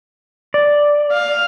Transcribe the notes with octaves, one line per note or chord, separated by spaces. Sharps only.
D5
F5